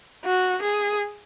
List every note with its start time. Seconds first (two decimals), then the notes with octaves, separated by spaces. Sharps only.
0.25 F#4
0.62 G#4